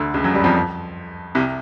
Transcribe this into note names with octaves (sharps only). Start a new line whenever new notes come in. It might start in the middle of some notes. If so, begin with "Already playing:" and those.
Already playing: D2 D3
C#2 C#3
F#2 F#3
G2 G3
F2 F3
C2 C3